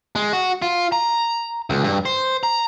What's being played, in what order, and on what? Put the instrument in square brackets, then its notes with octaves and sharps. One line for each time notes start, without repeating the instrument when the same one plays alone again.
[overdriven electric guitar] G#3
F#4
F4
A#5
C#2
G2
C5
A#5